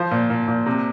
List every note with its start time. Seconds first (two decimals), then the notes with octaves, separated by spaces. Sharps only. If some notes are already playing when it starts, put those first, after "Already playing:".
Already playing: F3 C5
0.11 A#2
0.30 A#2
0.48 A#2
0.66 C3